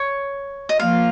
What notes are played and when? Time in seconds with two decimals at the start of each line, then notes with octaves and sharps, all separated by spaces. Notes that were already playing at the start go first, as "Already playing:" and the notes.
Already playing: C#5
0.69 D#5
0.80 F3 A#3 F4 F5